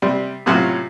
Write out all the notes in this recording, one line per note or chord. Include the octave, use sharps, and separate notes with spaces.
C3 G3
A2 C3 F#3 C#4 F4